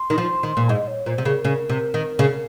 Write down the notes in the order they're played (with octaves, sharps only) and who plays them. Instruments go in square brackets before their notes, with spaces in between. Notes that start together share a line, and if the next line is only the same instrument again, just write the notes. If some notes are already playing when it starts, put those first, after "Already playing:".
Already playing: [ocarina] C6
[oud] D#3
F3
D#3
A#2
[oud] G#2 [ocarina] D#5
[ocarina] C#5
[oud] A#2 [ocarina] C5
[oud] C3
[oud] C#3 [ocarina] A#4
[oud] C#3
C3
D#3
C#3